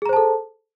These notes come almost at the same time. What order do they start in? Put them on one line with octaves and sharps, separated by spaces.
G#4 A#5 C5 A5 A4